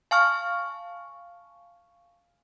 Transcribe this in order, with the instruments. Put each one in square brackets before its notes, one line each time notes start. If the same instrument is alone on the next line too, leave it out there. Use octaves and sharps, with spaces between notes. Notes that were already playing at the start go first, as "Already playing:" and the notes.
[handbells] F5 G#5 A5 C#6 F6